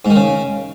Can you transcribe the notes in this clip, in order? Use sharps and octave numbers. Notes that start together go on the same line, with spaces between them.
G#2
D#3
C#3